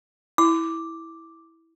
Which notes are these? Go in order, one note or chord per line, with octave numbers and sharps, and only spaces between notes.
E4 D6